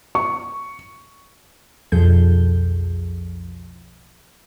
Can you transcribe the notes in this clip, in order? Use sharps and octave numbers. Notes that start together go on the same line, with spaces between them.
C#6
B1 F2 F3 G#4 A4 G6